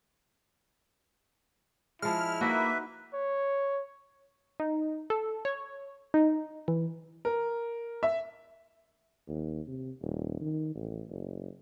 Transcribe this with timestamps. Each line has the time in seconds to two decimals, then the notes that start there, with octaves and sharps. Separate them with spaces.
2.02 F3 G#3 E4 F6
2.41 A#3 D#4 F#4 B4 E5
3.14 C#5
4.60 D#4
5.10 A4
5.45 C#5
6.14 D#4
6.68 E3
7.25 A#4
8.03 E5
9.28 D#2
9.67 C3
10.02 D#1
10.41 D#3
10.75 A1
11.09 F#1